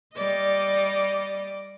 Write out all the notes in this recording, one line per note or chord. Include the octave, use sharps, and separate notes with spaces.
G3 D5 D#5